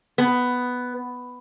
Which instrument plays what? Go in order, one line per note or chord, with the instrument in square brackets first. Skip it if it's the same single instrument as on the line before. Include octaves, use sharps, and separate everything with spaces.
[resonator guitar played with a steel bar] B3